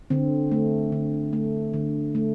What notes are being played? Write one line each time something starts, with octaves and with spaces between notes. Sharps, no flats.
D3 C4
A3
D3
A3
D3
A3